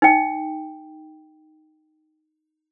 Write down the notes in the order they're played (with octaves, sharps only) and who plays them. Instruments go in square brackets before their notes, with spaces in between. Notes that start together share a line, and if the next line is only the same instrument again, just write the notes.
[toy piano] D#4 G5